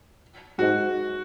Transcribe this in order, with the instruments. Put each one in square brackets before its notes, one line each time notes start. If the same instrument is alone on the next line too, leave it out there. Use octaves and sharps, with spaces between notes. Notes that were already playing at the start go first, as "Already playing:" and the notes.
[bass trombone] G#2 [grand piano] F#4